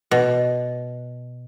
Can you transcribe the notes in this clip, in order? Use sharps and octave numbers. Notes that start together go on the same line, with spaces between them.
B2